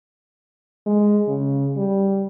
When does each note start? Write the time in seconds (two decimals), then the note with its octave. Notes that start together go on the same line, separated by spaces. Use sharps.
0.86 G#3
1.28 C#3
1.76 G3